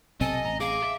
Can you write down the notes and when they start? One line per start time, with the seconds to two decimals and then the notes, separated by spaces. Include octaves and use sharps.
0.21 B1 C3 C4 A4 D#5 G#5
0.45 A1 A#5
0.60 G#4 F5 D6
0.82 E5